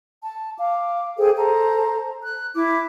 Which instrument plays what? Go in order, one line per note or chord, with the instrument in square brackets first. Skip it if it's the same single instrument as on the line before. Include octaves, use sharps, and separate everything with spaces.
[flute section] A5
F5 D6
G#4 A4 C5 G5
A4 C5 A5 A#5
F#6
E4 D6